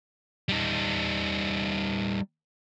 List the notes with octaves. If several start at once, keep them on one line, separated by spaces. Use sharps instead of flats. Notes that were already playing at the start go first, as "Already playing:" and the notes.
G3 D#4